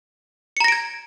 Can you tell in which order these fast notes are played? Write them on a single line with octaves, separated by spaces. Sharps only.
C#7 A#5 A#6 D7 G#6